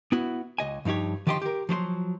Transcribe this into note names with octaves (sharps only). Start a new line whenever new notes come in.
B3 E4 F#4
C#2 D#5 G#5
G2 F3 D#4 G4 C#5
D#3 F3 F4 G4 D#5 C6
G4 A#4
F3 F#3 C5 C6